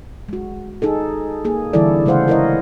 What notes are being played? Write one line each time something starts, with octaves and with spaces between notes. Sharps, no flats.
G#3 F#4
D#4 G#4 A4
A#3 G#4
D3 E3 G3 E4 A4 D5
C#3 G#3 A3 C5 F5 F#5
E4 A#4 C#5 D#5